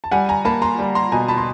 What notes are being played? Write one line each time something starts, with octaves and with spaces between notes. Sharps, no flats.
A5
G3 F#5 G#5
G#5 A#5
A#3 A5 B5
A#5 C6
G3
A#5 C6
B2 G#5 A#5
A5 B5
C6